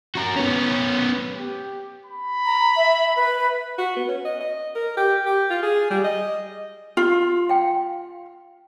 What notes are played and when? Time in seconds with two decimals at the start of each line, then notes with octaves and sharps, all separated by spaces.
0.15 F#4 A#4
0.36 B3 C#4
1.34 G4
2.06 B5
2.46 A#5
2.76 E5
3.16 B4
3.78 F#4
3.96 B3
4.09 C#4
4.25 D#5
4.40 D#5
4.75 A#4
4.97 G4
5.26 G4
5.50 F4
5.63 G#4
5.90 G3
6.04 D#5
6.97 F4 G4
7.49 F5 G5